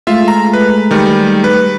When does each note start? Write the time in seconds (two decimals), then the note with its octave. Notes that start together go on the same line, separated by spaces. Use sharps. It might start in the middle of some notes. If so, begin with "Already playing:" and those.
0.07 G#3 A3 F4 E5
0.28 A#5
0.53 B4
0.91 D#3 G3
1.44 B4